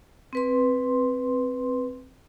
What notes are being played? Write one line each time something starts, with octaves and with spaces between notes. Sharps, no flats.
C4 B4 C6